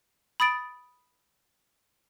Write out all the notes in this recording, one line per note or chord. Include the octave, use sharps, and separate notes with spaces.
B5 D#6 A6 D7